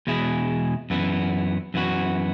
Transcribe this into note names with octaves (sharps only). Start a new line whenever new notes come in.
E2 B2 G#3 E4 G#4
F#2 E3 B3
F#2 E3 B3 F#4